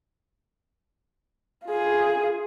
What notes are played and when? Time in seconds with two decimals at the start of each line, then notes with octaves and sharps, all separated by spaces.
1.66 F4 G#4